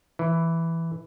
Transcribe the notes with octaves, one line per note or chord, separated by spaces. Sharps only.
E3